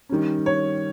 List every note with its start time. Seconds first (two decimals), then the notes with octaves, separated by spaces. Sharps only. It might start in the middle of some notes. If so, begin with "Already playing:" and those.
0.09 D#3 G3 C#4
0.46 C#5